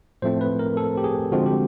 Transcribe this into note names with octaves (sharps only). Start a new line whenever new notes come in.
A2 F3 A3 C4 C5
B4
A#4
A4
G4
G#4
D3 F3 G#3 C4 F#4
G4